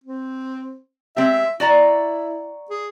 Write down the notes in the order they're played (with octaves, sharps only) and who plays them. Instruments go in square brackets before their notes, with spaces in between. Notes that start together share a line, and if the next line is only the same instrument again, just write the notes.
[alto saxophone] C4
[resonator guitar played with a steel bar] G#3 C4 G4 [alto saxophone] E5
[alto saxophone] E4 [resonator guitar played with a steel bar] F#4 D5 A#5
[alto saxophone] G#4